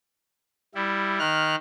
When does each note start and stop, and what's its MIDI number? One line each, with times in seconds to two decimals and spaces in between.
0.75 1.19 55
0.75 1.19 64
1.19 1.55 51
1.19 1.55 89
1.19 1.55 90